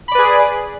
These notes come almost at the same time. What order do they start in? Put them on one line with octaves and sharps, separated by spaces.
B5 D5 B4 G#4